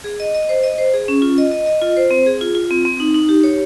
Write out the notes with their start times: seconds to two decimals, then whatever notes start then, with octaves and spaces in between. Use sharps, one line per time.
0.04 G#4
0.20 D#5
0.35 D#5
0.49 C5
0.63 D#5
0.78 C5
0.94 G#4
1.08 C#4
1.22 F4
1.38 D#5
1.51 D#5
1.66 D#5
1.82 F4
1.97 C5
2.11 C4
2.26 G#4
2.41 F4
2.55 F4
2.71 C4
2.85 C4
3.00 D#4
3.15 D#4
3.29 G4
3.43 C#5